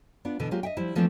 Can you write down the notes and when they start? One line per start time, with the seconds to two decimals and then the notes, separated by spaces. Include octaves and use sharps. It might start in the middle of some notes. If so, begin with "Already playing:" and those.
0.25 B3 D4 F4
0.40 B2 D3 E3
0.51 F#3 G#3 A#3 F4 G4
0.63 D#5 E5 G5
0.77 F3 G3 E4
0.95 E3 F3 A3 A#3 C4 D4